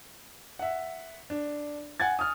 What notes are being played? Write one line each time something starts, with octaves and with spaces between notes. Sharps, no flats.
E5 F#5
D4
F#5 G#5 G#6 A6
D#6 F6